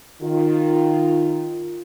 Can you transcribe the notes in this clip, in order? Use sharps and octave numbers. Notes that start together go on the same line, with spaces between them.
D#3 F4